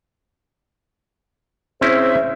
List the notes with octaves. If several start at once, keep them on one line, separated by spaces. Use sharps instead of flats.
C4 C#4 E4 G#4 C5 E5